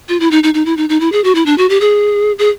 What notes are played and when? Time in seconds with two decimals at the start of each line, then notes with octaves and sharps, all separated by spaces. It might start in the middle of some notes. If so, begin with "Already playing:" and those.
0.09 F4
0.20 E4
0.31 D#4
0.43 D#4
0.54 D#4
0.66 E4
0.77 D#4
0.89 D#4
1.00 E4
1.12 G#4
1.24 F#4
1.35 E4
1.46 D4
1.58 F#4
1.70 G4
1.81 G#4
2.39 G#4